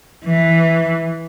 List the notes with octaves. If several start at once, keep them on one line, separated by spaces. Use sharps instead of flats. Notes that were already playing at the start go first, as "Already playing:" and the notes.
E3